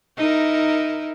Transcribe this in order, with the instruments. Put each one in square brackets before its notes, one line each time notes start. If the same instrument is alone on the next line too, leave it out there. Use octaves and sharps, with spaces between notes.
[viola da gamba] D#4 E4 A#4